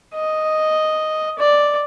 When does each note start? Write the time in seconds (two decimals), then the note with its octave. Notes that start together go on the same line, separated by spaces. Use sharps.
0.15 D#5
1.39 D5